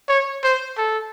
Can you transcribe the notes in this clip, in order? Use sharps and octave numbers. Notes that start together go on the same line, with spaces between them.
C#5
C5
A4